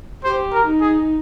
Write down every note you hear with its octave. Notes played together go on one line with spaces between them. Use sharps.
G4 C5
A#4
D#4
G#4